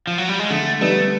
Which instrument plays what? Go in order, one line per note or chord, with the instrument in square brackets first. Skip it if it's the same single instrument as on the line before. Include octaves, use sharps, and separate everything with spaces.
[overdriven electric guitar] F3
F#3
G3
G#3
[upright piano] D3 [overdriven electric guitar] A3
[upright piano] G3 B3 D#4 [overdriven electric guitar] A3